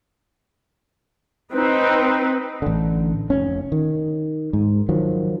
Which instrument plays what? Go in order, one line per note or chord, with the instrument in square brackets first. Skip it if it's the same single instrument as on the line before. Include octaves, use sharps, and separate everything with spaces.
[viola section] C4 D#4 B4
[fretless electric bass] A1 D3
F1 C#4
D#3
G#2
D#3 F3 F#3